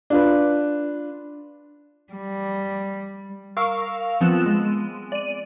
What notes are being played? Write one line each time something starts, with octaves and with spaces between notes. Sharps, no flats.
D4 F4 B4
G3
A#4 F5 C#6 E6
F3 B3 C4 F4 F#6 E7
G#3
D5 D#7